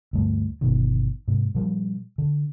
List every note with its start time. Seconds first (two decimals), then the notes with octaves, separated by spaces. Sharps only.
0.13 D2 G2 A3
0.61 G1 B2 D#3
1.28 G#2 C3
1.55 A#2 F3 G3
2.18 D3